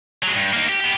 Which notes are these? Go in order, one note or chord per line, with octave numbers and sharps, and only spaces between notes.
F#3 G#3
G2
A#3 D#4
G4
B3 G4